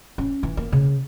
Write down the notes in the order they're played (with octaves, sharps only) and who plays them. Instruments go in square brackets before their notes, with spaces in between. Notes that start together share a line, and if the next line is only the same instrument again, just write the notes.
[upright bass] C#4
E3
A#3
C#3